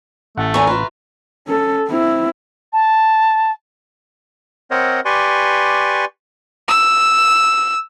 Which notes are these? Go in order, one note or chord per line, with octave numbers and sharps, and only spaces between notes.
A1 A3 F#5
E2 A4 G#5 A#5 C#6
F4 B4 E5
C#4 A4
C4 E4
A5
C4 A#4 C5 C#5 D#5 F#5
G4 B4 D5 G#5 C6 C#6
E6